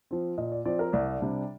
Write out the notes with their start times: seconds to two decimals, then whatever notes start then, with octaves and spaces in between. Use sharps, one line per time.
0.11 F3 C4
0.38 A#2 D#5
0.52 D5
0.65 F3 C4 D5
0.79 A#4
0.92 C2 D5
1.20 C3 G3 D4